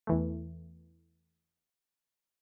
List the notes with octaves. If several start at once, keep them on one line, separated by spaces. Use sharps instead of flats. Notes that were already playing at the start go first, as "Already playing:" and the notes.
E2 E3 A3